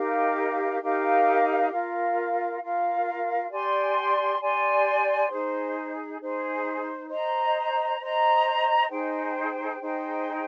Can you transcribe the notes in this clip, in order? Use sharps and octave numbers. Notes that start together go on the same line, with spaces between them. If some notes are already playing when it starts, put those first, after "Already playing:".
Already playing: D#4 G4 A#4 F5
D#4 G4 A#4 F5
F4 A#4 F5
F4 A#4 F5
G4 D5 G#5 C6
G4 D5 G#5 C6
D#4 G#4 C5
D#4 G#4 C5
C5 D#5 A#5
C5 D#5 A#5
D#4 G#4 C5 G5
D#4 G#4 C5 G5